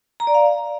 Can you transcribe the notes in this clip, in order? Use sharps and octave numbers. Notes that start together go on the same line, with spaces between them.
A#5
D5
F5